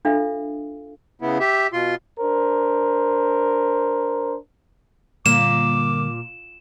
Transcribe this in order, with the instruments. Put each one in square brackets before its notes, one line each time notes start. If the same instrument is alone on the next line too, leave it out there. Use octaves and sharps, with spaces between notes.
[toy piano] D4 F4 A4 E5 F5
[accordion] C#3 B3 E4
G4 E5
B2 F4 C6
[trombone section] D4 A#4 C5
[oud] A#2 [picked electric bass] D3 G3 [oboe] D6 [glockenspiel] E7